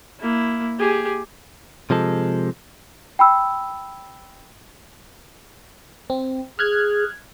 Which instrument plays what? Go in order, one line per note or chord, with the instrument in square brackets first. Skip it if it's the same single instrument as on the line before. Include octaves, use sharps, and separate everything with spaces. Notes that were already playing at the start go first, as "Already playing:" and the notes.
[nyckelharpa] A#3 E4
G4 G#4
[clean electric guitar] C3 F3 G#3 A4
[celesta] G5 B5 E6
[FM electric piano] C4
[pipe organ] G#4 [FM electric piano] F6 F#6 G#6